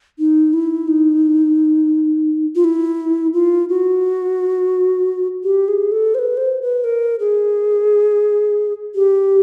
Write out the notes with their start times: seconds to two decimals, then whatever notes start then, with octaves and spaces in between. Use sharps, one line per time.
0.19 D#4
0.53 E4
0.88 D#4
2.55 F4
2.64 E4
3.34 F4
3.69 F#4
5.44 G4
5.68 G#4
5.92 A4
6.15 C5
6.19 B4
6.37 C5
6.62 B4
6.84 A#4
7.20 G#4
8.95 G4